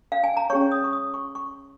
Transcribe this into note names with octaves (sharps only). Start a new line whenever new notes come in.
F5
G#5
A#5
C#4 G#4 C#5 C#6
D#6
C#6
D#6
C#6
C#6